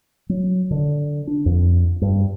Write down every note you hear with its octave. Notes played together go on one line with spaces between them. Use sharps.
F#3
D3
D4
F2
G2